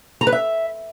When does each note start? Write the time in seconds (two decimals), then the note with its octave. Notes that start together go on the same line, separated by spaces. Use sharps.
0.21 A#5
0.27 B4
0.32 E5